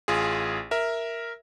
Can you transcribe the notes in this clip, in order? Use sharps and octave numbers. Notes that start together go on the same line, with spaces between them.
A1 F4 G#4
A#4 E5